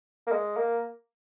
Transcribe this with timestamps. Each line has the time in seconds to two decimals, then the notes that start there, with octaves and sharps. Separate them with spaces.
0.27 A#3
0.32 G#3
0.56 A#3